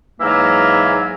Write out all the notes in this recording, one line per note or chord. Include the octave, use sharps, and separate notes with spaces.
G#2 E3 F#3 A#3 E5 F6